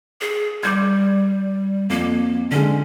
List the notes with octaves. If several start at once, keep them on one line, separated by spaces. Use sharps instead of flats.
G#4
G3 D6 G6 G#6
F2 A#3
D3 G#3 C#4